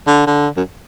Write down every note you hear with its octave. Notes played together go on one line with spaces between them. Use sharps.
D3
D3
F#2